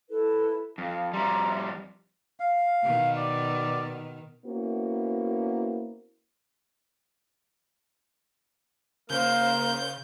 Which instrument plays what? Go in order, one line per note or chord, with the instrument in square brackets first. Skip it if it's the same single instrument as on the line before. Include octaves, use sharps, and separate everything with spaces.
[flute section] E4 A4 B4
[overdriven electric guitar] F2 [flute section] F5
[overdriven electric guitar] F2 G3 [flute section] E5 A#5 C6
[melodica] F5
[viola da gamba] B2 D#3
[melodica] D5
[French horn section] A#3 B3 C#4 E4 F#4 C5
[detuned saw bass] C#3 [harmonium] A#3 A#4 [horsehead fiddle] C5 F5 [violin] G6